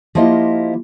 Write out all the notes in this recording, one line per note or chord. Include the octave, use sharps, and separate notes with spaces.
F3 A#3 E4 F4 G4 D#5